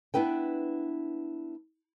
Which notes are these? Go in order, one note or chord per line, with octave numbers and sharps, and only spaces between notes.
B3 D4 E4 B4 G5